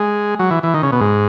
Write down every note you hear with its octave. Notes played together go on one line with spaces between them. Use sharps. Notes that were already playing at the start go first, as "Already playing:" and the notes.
Already playing: G#3
F#3
E3
E3
D#3
C#3
B2
G#2